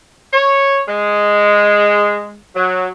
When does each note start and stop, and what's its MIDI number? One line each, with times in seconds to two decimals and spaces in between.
0.33 0.80 73
0.89 2.38 56
2.56 2.88 54